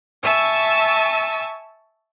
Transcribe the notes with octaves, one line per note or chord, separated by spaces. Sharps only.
E5 G#5 A5 C#6 E6